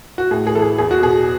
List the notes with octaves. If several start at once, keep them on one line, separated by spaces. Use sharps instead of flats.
F#4
A2 G#4
G#4
E3 A4
G#4
E2 G#4
F#4
B2 G#4